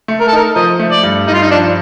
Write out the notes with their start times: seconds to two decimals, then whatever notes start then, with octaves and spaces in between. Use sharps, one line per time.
0.08 A3
0.20 A#4
0.28 A4
0.33 D#4 A#4
0.56 F3 D#5
0.80 A3
0.92 D5
1.03 G2
1.28 G2 D#4
1.34 F4
1.42 D#4
1.51 F3 D4